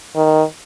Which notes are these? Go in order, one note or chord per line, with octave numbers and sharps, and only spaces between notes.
D#3